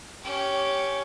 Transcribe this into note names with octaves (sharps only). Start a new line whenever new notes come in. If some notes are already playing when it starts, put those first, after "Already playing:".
C#4 G4